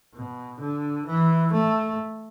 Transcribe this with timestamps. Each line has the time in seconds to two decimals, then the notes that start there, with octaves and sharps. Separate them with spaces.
0.14 B2
0.60 D3
1.06 E3
1.53 A3